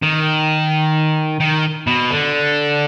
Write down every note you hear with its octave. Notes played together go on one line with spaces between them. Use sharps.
D#3
D#3
B2
D3